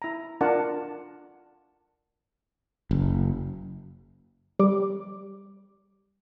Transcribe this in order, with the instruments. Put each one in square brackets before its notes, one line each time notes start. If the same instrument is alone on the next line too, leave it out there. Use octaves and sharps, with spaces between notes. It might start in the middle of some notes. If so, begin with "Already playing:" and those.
[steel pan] E4 A#5
D4 F4 A#4 F#5 A5
[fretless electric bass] F#1
[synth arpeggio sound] G3 D6